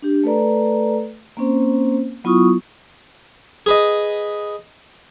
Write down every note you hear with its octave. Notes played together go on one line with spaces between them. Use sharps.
D4 G4
A3 A4 B4 D5 A#5
A#3 C4 C#4 C5
F#3 B3 E4 F4 C#6 D#6
G#4 B4 D#5